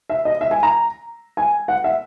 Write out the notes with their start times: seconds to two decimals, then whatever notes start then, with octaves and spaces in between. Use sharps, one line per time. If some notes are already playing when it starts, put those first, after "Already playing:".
0.10 E5
0.25 D#5
0.41 E5
0.51 G#5
0.63 A#5
1.37 G#5
1.68 F#5
1.84 E5